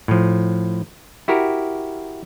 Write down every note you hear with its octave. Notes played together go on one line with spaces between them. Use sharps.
A2 F3
E4 F#4 G4 A#4